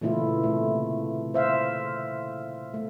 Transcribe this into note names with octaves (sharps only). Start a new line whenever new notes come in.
A#2 C#3 E3 A3 E4 F4
C3 A3
C5 E5 F5
A3